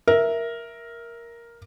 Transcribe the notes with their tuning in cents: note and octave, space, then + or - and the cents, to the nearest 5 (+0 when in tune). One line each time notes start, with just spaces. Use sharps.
A#4 +5 E5 +0